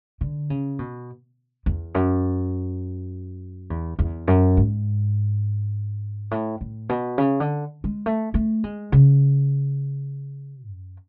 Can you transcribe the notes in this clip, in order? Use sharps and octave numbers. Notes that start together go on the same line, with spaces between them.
D3
C#3
B2
E2
F#2
E2
E2
F#2
G#2
A2
A2
B2
C#3
D3
G#3
A3
A3
G#3
C#3
F#2